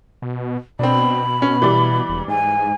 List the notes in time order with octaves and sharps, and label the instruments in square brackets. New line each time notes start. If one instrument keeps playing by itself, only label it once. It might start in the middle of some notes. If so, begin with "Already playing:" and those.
[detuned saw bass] B2
[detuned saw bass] B2 [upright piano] C4 D4 [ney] B5
[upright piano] C#4
E3 G3 D5
[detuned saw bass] E1
[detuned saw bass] G#2 [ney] G#5